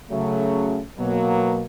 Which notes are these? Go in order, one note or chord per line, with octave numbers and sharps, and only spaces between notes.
C#3 F#3 A3
B2 F#3 A#3